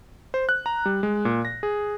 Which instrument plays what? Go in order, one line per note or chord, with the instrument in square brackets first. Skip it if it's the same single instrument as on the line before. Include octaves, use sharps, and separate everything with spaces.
[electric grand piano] C5
F#6
A#5
G3
G#3
A#2
A#6
G#4